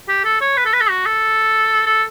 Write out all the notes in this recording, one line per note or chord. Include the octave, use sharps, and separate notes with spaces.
G4
A4
C#5
B4
A4
B4
A4
F#4
A4
A4